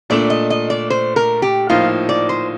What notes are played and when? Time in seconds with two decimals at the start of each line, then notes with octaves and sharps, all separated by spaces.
0.10 A#2 A3 D4 D5
0.30 D#5
0.50 D#5
0.70 D5
0.90 C5
1.16 A#4
1.42 G4
1.69 A2 F3 A#3 D#4 F4
2.09 D5
2.29 C5